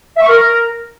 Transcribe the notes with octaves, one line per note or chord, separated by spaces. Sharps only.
E5
C#6
A#4